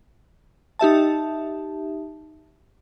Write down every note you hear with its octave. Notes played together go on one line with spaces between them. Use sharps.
D#4 G4 E5 A5